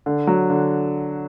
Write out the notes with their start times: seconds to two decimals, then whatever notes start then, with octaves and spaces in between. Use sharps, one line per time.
0.06 D3
0.27 F#3
0.50 D3